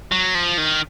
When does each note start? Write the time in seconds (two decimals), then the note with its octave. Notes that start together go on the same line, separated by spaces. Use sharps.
0.12 F#3
0.35 F3
0.58 D#3